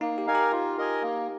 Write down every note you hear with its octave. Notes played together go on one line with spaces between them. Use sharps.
A#3 D#4
G4
D#4 A#4 F5 G#5
G4
F4
A#4 D#5 G#5
A#3